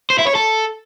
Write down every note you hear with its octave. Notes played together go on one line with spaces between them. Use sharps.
C5
E4
C#5
A4